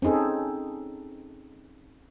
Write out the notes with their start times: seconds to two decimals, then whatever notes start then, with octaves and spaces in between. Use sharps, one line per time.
0.02 C4 C#4 D#4 G#4 A4